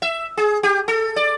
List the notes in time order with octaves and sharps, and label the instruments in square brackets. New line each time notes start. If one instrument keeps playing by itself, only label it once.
[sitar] E5
G#4
G4
A4
D5